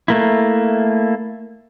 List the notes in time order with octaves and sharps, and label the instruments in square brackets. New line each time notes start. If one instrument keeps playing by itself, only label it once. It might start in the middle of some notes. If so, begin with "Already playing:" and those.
[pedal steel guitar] A3 A#3 E4